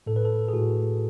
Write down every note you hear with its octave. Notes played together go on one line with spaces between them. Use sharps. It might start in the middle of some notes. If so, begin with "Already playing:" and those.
A2 A4
B4
A4
G#4
A2 F#4